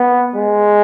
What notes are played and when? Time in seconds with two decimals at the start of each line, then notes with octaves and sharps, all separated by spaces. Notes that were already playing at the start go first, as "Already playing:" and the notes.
Already playing: B3
0.35 G#3